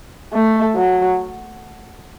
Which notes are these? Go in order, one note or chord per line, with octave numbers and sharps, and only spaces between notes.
A3
F#3